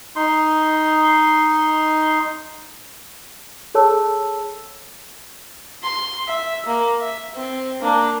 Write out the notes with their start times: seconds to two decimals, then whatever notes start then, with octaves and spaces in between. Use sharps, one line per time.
0.16 D#4 C6
3.75 G#4 A4 C#5 A5 E6
5.83 C6
6.28 E5
6.66 A#3
7.01 E5
7.35 C4
7.81 A#3 D4